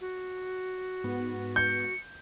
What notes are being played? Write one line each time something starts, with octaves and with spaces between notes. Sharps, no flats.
F#4
G#2 B3
G6 C#7